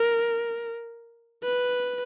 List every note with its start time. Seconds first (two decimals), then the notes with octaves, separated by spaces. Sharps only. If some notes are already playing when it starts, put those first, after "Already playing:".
Already playing: A#4
1.43 B4